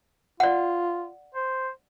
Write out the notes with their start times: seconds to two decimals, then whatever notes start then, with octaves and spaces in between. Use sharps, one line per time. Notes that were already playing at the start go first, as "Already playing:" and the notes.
0.40 F4 D5 F#5
1.35 C5